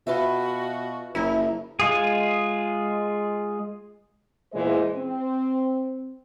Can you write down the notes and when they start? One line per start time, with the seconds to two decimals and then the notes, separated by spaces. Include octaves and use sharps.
0.07 B2 F4 F#4 B4 E5
1.15 F#1 F#2 F3 E4 A#4
1.80 G#3 F4 G#4
4.53 E2 A#2 E3 G#3 C5 D#5
4.96 C4